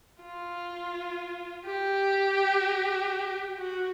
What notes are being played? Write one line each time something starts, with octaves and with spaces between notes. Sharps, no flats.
F4
G4
F#4